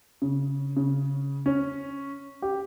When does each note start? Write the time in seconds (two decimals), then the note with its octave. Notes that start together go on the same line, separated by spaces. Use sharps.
0.22 C#3
0.77 C#3
1.46 C#4
2.42 G4